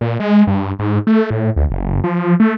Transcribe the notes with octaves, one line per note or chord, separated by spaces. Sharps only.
A#2
G#3
G2
G#2
A3
A2
D2
F#1
F3
A3